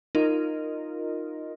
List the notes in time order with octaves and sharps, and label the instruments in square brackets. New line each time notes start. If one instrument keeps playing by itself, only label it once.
[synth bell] D#4 [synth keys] F4 A#4 D#5